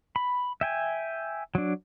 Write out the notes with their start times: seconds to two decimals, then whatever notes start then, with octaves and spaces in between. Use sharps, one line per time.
0.16 B5
0.61 E5 G5 G#5
1.55 F#3 D4